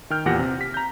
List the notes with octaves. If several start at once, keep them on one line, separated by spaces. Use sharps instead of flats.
D#3 G5 F6 G6
E2 A#2 G4 F#5 A#6
C3
B6
A#5 G6